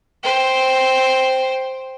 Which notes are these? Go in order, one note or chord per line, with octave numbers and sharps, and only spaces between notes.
C5 G5